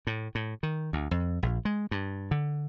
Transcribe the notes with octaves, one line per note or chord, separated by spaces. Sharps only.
A2
A2
D#3
D2
F2
A#1
G#3
G2
D3